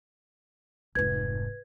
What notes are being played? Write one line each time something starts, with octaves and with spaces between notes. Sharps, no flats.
F1 G#2 B4 G#6